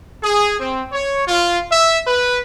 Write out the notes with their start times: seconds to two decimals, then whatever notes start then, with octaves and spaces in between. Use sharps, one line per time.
0.23 G#4
0.60 C4
0.92 C#5
1.28 F4
1.71 E5
2.07 B4